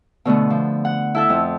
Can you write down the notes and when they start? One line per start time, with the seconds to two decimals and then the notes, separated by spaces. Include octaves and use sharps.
0.25 B2 D3 A3 B3
0.50 F3
0.85 F#5
1.15 E4 A4 E5
1.29 F2